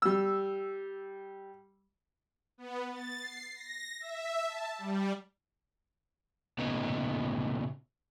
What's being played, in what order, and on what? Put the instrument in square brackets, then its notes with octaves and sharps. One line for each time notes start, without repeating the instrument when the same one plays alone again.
[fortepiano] G3 E6
[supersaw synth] B3
A6
C7
A#6
E5
A5
G3
[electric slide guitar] A#2 C#3 A3 B3 D#4